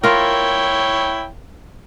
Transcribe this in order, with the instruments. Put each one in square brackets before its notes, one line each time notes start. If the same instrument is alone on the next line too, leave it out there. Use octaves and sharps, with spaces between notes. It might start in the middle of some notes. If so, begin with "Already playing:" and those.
[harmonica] E4 C#5 G5 [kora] F4 A#4